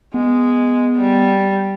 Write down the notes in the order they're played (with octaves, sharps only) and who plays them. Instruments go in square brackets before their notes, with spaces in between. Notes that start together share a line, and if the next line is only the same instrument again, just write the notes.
[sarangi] G#3 [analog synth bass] B3
[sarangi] G3